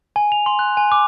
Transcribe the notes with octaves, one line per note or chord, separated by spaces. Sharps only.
G#5
F7
C6
F#6
G#5
D6